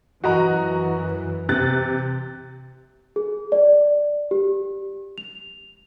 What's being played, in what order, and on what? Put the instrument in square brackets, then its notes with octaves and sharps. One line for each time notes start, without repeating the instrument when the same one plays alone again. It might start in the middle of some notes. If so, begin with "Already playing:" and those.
[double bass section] F#2 E3 [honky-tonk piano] F#4 D#5 A#5
[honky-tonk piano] C3 F#6 A6
[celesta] G#4
D5
G4
F7